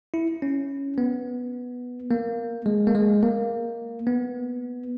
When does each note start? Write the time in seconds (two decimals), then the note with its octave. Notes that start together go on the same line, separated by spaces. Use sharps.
0.14 E4
0.42 C#4
0.98 B3
2.11 A#3
2.66 G#3
2.87 A#3
2.95 G#3
3.23 A#3
4.07 B3